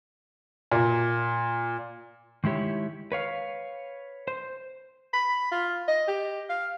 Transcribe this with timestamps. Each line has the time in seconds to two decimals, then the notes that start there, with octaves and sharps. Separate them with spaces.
0.72 A#2
2.44 D#3 G#3 E4 G4 C#5
3.12 B4 C#5 F5
4.28 C5
5.14 B5
5.51 F4
5.88 D#5
6.08 G4
6.50 F5